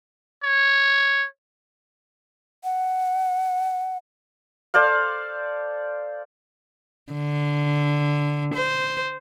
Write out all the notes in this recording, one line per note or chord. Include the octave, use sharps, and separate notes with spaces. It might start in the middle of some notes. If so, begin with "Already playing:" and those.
C#5
F#5
A4 C5 D5 F5
D3
C5